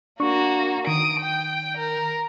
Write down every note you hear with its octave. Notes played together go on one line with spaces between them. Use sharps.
A#3 D4 F#4 C#6
D#3 D#6 D7
G5
A#4